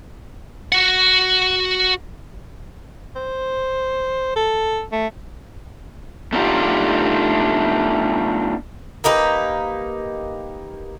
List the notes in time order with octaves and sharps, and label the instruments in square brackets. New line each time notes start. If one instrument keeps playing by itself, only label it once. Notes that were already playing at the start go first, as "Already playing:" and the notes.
[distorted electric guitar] F#4 F#5
[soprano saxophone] C5
A4
A3
[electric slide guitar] A3 B3 D4 D#4 F4 G4
[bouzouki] A#3 D#4 G4 B4